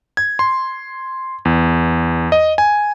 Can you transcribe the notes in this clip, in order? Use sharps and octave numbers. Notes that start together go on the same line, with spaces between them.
G#6
C6
E2
D#5
G#5